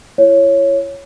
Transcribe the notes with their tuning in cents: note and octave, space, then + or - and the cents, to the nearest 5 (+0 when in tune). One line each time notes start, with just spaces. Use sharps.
E4 +40 C#5 +0